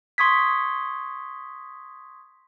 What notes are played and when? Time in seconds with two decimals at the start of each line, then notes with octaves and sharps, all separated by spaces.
0.18 C6 C#6 D#6 G#6 B6